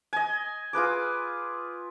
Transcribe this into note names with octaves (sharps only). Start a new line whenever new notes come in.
D#5 G#5
F4 G#4 B4 D6